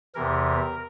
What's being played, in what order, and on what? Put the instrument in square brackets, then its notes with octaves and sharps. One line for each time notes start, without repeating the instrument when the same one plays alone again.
[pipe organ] E2 C3 E3 A#4